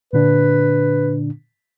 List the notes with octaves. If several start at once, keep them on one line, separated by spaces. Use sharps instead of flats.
A#2 D3 D4 B4